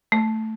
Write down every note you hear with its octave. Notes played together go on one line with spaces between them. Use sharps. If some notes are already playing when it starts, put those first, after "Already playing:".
A3